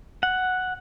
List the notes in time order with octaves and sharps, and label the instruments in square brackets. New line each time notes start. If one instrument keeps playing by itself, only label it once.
[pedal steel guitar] F#5